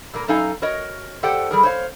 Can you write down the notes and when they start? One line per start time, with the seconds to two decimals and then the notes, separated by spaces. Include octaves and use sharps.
0.13 A#2 A#3 A#4
0.28 F#2 D#4 A4 F5 G#5 A#5
0.62 F#4 A#4 C#5 D#5
1.23 G4 A4 C5 D5 F#5 G5
1.51 G3 G#4 A#4
1.63 C5 C#5 F5